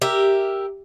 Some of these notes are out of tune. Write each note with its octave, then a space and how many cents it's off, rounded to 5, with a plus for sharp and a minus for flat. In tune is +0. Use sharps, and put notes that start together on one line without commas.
G4 +0 A#4 +0 E5 +0